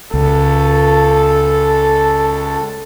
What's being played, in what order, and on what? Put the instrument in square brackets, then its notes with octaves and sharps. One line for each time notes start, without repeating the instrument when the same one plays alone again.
[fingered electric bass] C#2 [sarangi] A4